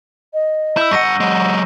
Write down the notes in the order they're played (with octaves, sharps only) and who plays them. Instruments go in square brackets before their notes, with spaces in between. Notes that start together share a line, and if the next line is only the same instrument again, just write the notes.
[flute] D#5
[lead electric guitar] E4 [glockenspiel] E6 G6
[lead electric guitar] G2 F#5 [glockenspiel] C#6 A#6 D#7
[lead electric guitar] F#3 G#3 [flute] F#5